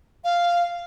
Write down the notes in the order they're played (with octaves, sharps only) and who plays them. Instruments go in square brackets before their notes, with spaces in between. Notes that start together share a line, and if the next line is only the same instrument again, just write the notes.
[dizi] F5